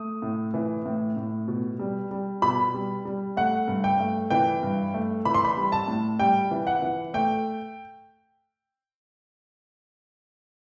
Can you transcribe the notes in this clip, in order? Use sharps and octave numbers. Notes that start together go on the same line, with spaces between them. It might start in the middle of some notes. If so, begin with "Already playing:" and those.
Already playing: A3 D#6
A2
E3
A2
A2
B2
G3
G3
B2 B5
G3
G3
A3 F#5
G2
G5
A3
E3 G5
G2
A3
E3 B5
C6
B5
G3
A5
A2
G3 G5
E3
F#5
E3
A3 G5